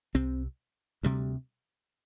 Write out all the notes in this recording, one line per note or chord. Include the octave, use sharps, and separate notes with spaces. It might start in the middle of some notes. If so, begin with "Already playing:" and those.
C2 C3 C4
D2 C3 G3